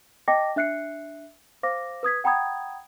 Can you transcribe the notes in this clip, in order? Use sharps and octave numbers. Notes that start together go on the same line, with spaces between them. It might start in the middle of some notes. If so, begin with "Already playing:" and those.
D#5 G5 A5 D6 A#6
D4 E5 F#6 C7 C#7
C5 F5 D6 A#6
B4 D#6 G#6 B6
F#5 G5 A#5 B5 D#6 G#6